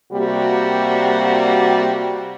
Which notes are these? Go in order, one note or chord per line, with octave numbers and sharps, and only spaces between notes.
C3 G3 A#3 F#4